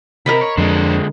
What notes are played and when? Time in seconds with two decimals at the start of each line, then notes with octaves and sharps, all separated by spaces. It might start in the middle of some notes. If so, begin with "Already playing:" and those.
0.26 C3 A#4 D#5 B5
0.41 C#5
0.57 F2 D3 G#3 D4 C5